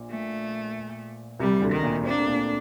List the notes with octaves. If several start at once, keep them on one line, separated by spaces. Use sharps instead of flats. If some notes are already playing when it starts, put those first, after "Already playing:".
Already playing: A#1 A#2
A3
C2 C3 G3
D2 D3
D#3
A#2 A#3
C4 D4
A#3
A3
A#2 A#3